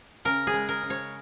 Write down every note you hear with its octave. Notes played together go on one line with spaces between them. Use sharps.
C#3 A#4
G#4
G#3
A#4
C#3
C#5